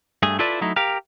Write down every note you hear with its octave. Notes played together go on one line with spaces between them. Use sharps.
G2 A3 G#4
E4 F4 A4 B4 D5 E5
F#3 A3 D#4 E4
G4 A#4 F5